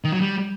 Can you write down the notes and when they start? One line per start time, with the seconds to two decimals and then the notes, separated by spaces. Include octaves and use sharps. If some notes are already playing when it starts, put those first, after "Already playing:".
0.04 D#3
0.12 F#3
0.21 G3